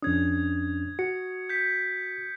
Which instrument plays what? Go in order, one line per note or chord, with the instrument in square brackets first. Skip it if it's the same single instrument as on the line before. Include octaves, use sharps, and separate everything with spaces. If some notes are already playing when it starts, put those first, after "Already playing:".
[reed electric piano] F2 C#4 D4 [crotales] D#6 G#6
[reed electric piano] F#4 [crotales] C#7
[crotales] G6 B6